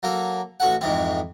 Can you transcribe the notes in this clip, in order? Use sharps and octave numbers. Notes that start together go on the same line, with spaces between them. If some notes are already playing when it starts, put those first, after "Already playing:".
F#3 A#3 A4
A1 F#4 A4 F#5
F2 G#2 E3 C4